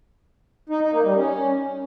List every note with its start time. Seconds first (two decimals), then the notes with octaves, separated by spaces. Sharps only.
0.69 D#4
0.81 D#4
0.93 A#3
1.04 G3
1.16 C#4